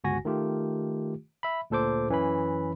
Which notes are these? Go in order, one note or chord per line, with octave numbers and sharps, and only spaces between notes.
G1 C#2 F#4 G#5 A#6
D#3 A3 F4 G4
E5 B5
D2 A#2 A4 C5 D6
F#2 E3 C#4 B4 B5